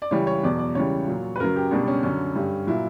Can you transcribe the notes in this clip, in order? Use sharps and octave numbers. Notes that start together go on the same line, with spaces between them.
D5
C#2 C#3 E3 G3 C#5
C#5
E2 B2 F#3 D5
D5
C#2 C#3 E3 G3 C#5
A#2 F#3
B4
F#2 C#3 F#3 A#4
G4
C#2 B2 G3 D4
C#4
F#2 D3 F#3 C#4
G2 D3 G3
A#2 F#3 E4